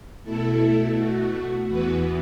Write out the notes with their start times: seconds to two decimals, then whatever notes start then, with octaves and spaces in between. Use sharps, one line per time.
0.24 B2 A3 E4 A4
0.96 F#4
1.68 E2 E3 B3 F#4 B4